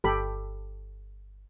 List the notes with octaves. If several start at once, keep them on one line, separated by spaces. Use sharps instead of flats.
G1 G4 A4 B5